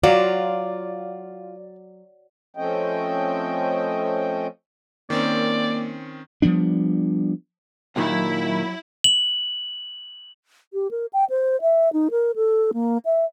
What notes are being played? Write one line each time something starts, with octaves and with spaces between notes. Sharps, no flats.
F#3 F4 D5
F3 A3 C4 C#4 D#5 G5
D#3 A#3 C4 C#4 D5
F3 G3 B3 D4
D#2 A#2 D#3 F#3 E4
F#7
G4
A#4
G5
C5
E5
D#4
A#4
A4
A#3
E5